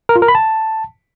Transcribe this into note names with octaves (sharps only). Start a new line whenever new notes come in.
A#4
F4
A#4
B5
A5